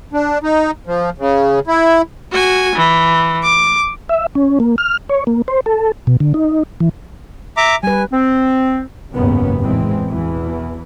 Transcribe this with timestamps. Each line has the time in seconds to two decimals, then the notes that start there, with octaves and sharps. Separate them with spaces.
0.13 D4
0.43 D#4
0.87 F3
1.18 C#3
1.67 E4
2.31 F#4 G#5
2.75 E3
3.43 D6
4.09 E5
4.35 C#4
4.60 A#3
4.78 F6
5.09 C#5
5.27 A#3
5.48 C5
5.66 A4
6.07 B2
6.20 D3
6.34 D#4
6.80 E3
7.57 E5 A#5 D6
7.83 G3 B4 G#5
8.12 C4
9.14 F#1 D#2 G#2 C#3 B3
9.59 A1 E2 E3 G#3 C4
10.09 E2 B2 E3